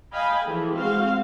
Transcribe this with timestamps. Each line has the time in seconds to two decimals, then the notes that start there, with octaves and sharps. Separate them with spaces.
0.12 D#5 F5 G5 G#5 B5
0.45 E3 F3 G#4 A4
0.74 G#3 C4 F#4 F5 C6